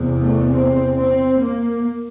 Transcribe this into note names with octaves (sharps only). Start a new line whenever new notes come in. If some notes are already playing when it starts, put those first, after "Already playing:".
Already playing: E2 C3
A3
C4
C4
A#3